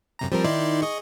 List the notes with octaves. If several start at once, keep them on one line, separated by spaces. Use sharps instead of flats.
F#2 C3 A#5
F3 G3 C4 A#4
D#3 D#4 E4 D5 C6
G#4 D#5 C#6